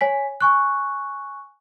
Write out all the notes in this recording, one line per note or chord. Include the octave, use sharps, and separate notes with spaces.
C#5 G#5 B6
G#5 C#6 F#6